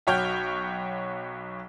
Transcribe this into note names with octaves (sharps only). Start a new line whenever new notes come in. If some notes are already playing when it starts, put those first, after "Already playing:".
B1 F#4 C#5 G5 F6 G6